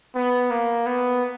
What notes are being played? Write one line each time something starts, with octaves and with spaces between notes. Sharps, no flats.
B3
A#3
B3